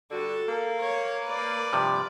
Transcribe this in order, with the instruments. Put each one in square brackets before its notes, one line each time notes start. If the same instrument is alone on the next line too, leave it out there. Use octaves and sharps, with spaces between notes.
[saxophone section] G2 D3 F#4 [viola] A4
[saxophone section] A#3
[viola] C#5
B4 D5
[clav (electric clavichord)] G2 C3 F3